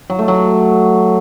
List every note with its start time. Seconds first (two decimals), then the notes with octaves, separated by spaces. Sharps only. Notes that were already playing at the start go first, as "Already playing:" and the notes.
0.10 F#3
0.19 A3
0.28 F#3